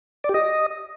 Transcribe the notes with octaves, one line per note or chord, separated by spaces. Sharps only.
D5
G4
D#5